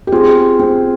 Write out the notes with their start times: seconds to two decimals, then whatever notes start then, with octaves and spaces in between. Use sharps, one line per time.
0.07 G4
0.12 C4 F4 G#4
0.60 C4